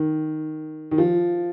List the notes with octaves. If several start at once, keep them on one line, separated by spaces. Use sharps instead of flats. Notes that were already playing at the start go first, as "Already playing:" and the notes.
Already playing: D#3
D#3
F3